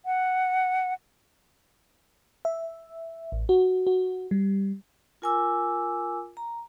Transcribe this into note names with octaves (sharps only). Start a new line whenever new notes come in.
F#5
E5
A1
F#4
F#4
G3
F4 A#4 G#5 D6 E6
A#5